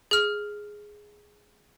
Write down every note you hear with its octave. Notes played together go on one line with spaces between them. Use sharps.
G#4 F6